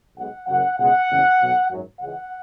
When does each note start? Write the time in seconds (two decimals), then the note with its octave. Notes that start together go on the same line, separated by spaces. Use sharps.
0.17 B1 B2 G#3 F#5
0.48 F#1 F#2 C#3 F#3 F#5
0.78 C#2 B2 G#3 F#5
1.09 F#1 E2 C#3 F#3
1.40 B1 B2 F#3
1.71 G#1 F#2 F#3
2.00 C#2 C#3 E3 G#3 F#5